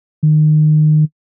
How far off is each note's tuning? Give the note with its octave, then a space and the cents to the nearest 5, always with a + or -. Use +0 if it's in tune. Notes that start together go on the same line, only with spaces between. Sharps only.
D#3 -25